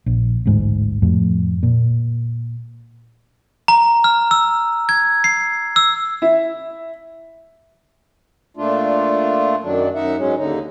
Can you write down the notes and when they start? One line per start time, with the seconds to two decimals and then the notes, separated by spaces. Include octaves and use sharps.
0.06 A#1
0.46 A1 D2 G#2
1.02 F2 A2
1.63 A#2
3.68 A#5
4.04 F6
4.31 E6
4.89 G#6
5.24 C7
5.76 E6
6.22 E4
8.57 A#2 A3 D4 F4
9.63 F#2 D#3 F#3 D4
9.95 F#2 D#4 E5 F#5
10.17 G#2 F#3 G#3 C#4
10.38 D#2 D3 D#4